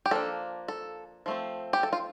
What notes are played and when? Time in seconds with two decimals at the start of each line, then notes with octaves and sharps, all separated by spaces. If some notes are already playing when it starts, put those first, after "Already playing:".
0.06 G4
0.11 F3 A#3 D4 A4
0.68 A4
1.26 F3 A3 C4
1.73 G4
1.83 A4
1.93 F4